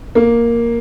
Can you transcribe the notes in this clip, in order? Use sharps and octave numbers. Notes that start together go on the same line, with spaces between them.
A#3